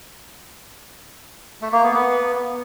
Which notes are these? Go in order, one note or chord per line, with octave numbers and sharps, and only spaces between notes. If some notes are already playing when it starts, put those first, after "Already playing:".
A3
A#3
B3
B3